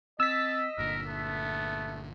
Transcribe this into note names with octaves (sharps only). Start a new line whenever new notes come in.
C4 D#5 A5 E6 B6
G1 A#2 D3 A#4
A3 B3